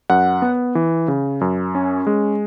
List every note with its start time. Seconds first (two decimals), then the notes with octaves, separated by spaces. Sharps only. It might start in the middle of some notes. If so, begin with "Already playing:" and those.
0.10 F#2 F#5
0.42 B3
0.75 E3
1.08 C#3
1.41 F#2
1.75 C#4
2.07 G#3